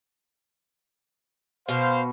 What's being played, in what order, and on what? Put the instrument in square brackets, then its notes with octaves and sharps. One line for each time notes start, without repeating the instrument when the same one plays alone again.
[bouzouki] B2 [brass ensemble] C5 F5